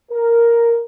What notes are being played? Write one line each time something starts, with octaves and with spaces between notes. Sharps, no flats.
A#4